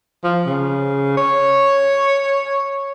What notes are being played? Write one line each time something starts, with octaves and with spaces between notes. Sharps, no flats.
F3
C#3
C#5